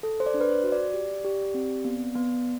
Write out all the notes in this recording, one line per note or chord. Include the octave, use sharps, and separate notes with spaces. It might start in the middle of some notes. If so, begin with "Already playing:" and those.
A4
C5
D5
D4
B4
C5
F#4
D5
G4
G4
C4
B3
B3